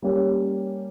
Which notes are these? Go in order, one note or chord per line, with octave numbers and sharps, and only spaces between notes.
G3 A#3 C#4 G4